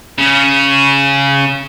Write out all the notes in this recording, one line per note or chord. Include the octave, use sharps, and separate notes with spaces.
C#3